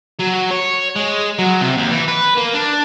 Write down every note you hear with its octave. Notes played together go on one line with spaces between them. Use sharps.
F#3
C#5
G#3
F#3
C3
D#2
E3
B4
A#3
D4